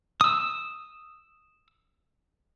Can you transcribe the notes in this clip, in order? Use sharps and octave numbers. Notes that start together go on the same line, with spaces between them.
D#6 E6